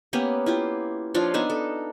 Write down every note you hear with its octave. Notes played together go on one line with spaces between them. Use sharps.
A#3 B3 C#4 G4
E4 F4 G4
F3 D4 F4 C#5
B3 D4 D#4 E5
A4